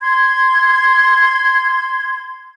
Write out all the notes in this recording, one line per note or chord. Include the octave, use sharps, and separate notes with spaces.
C6 G#6